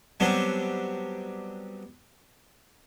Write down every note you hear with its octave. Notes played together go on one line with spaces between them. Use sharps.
F#3 G3 B3 C4 D4